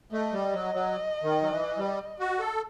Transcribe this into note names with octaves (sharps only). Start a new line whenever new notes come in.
A3 D#5
G3
F#3
F#3
D#3
F#3
E3
G3
F#4
A4